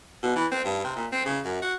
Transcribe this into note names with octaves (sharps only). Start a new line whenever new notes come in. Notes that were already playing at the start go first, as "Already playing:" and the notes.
B2
E3
C4
G2
C3
A#2
C4
C#3
F#2
F#4